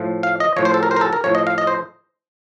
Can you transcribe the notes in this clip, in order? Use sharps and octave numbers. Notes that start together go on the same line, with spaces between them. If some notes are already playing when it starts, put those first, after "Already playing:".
Already playing: A2 F3
F5
D#5
A2 F3 C#5
C5
A4
A#4
C5
A#4
A4
A#4
A2 F3 C#5
D#5
F5
D#5
C5